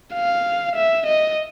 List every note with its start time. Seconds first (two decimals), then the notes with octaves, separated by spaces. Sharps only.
0.14 F5
0.75 E5
1.06 D#5